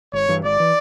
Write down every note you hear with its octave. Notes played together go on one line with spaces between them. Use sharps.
G#1 C#5
G2 E3
G#1 D5
E3